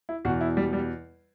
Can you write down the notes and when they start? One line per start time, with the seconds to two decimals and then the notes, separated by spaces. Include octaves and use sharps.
0.09 E4
0.25 E2 B2 F#4
0.41 E4
0.57 G3
0.73 G3